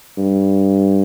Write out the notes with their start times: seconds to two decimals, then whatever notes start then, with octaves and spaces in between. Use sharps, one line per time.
0.17 G2